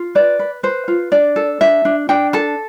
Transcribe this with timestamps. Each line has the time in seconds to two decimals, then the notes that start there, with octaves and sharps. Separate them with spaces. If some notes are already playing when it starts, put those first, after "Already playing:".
Already playing: F4
0.15 B4 D5
0.39 B4
0.63 B4 C5
0.88 F4
1.12 D4 D5
1.36 A4
1.61 D4 E5
1.85 D4
2.09 D4 G5
2.33 A4 A5